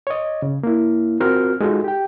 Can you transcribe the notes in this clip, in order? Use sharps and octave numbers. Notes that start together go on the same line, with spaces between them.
C#5 D#5
C#3
A#3 E4
C4 F4 F#4 A#4 F6
G#3 D#4 F4 F#4 A4
G4 G5